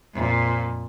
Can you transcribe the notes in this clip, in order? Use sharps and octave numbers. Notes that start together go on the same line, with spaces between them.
F2 A#2